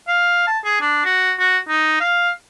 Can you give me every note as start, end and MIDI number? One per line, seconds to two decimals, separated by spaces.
0.08 0.43 77
0.47 0.59 81
0.65 0.80 68
0.81 1.02 62
1.05 1.33 66
1.39 1.59 66
1.69 1.99 63
2.00 2.30 77